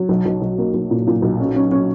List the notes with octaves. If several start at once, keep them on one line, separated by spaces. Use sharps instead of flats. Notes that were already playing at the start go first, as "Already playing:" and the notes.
Already playing: F#3
B1
B1
B1
A#3
B1
A#2
A#2
B1
C#4
C#4
C#4